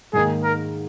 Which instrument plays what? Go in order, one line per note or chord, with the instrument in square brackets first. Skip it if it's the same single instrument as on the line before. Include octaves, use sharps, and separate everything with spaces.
[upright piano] G#2 D#3 A#3 D#4 [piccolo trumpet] G#4
[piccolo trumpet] A#4